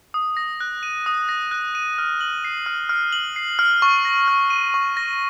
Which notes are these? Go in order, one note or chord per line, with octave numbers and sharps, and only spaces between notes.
D#6
A#6
F#6
D#7
D#6
A#6
F#6
D#7
F6
F#7
C7
F6
F6
F#7
C7
F6
C#6
A#6
F6
D#7
C#6
A#6